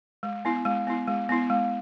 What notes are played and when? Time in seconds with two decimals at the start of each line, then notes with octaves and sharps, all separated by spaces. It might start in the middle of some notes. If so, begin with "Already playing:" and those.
0.23 G#3
0.45 B3 E4
0.65 G#3
0.87 B3 E4
1.07 G#3
1.29 B3 E4
1.50 G#3